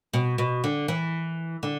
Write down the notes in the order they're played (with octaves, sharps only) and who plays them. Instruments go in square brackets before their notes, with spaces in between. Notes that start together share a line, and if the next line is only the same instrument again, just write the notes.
[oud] B2
B2
D3
E3
D3